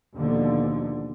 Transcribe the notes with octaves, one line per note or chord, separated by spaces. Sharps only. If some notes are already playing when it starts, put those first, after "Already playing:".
D#2 B2 D3 F3